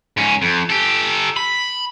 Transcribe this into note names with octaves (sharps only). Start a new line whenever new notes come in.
G#2 C#4
F2
G4 A4
B5